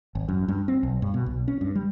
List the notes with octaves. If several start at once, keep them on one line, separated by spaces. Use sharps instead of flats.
G#1
F#2
G2
C4
B1
G2
B2
B1
C#4
G2
G3